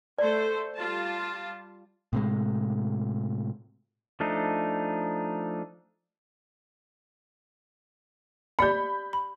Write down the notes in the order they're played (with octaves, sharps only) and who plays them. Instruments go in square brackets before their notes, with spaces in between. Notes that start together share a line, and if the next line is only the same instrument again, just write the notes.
[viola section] A3 A4 C5 [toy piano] D5
[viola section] G3 F4 A5
[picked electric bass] A2 C3 G#3
[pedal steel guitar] F3 A3 D4 D#4
[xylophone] G4 D5 C#7 [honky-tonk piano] B5 G6
[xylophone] B5